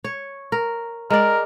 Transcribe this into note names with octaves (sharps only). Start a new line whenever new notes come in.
C#5
A#4
G#3 A#4 D5